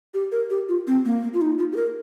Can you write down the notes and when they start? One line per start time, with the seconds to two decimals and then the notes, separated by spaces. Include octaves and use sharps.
0.14 G4
0.32 A#4
0.50 G4
0.69 F4
0.87 C4
1.05 A#3
1.23 A#3
1.34 F4
1.41 D#4
1.59 F4
1.73 G4
1.76 A#4